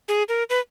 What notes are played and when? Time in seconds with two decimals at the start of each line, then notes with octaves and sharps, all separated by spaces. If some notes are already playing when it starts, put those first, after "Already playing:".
0.08 G#4
0.29 A#4
0.50 B4